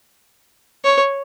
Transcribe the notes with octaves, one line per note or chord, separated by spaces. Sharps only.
C#5